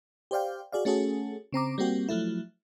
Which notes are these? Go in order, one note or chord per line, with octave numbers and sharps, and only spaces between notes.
G4 C5 D5 F5 G5
F#4 G#4 D5 F5
A3 C#4 F#4 G#4 A4
C#3 C4 A#5 D6
G3 A#3 C4 F#4 G4
F3 F#3 A3 E4